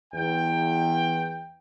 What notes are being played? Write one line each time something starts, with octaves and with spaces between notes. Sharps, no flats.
E2 G5